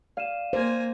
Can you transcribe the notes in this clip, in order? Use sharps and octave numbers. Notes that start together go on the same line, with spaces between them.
D5 F5 D#7 E7
A#3 C5 G#5